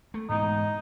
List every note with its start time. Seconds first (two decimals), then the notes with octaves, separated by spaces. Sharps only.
0.14 A3
0.29 G#2 B2 E3 D#4